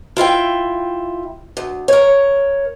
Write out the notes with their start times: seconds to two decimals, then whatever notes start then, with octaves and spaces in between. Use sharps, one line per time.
0.17 E4 F4 E5 G5
1.57 D2
1.88 A#4 C#5